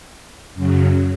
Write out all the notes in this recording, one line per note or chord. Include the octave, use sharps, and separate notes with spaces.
F#2 C#3 F#3